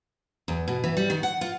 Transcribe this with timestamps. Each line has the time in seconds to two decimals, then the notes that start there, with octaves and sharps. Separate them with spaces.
0.48 E2
0.68 B2
0.84 E3
0.97 G3
1.10 D#3
1.23 F#5
1.41 F4